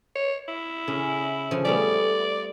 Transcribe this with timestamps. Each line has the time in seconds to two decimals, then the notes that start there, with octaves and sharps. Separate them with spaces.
0.16 C#5
0.48 E4
0.88 C#3 C#4
1.51 C#3 F3 G#5
1.65 G3 A3 B3 D5